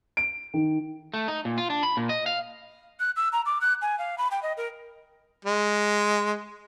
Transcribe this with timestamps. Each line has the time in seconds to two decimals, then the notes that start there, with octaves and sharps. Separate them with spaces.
0.17 D7
0.54 D#3
1.14 A3
1.28 D#4
1.45 A#2
1.58 F4
1.70 D4
1.83 B5
1.97 A#2
2.09 D#5
2.26 F5
3.00 F#6
3.16 E6
3.32 A#5
3.46 D6
3.61 F#6
3.82 G#5
3.98 F5
4.18 B5
4.31 G5
4.43 D#5
4.57 A#4
5.45 G#3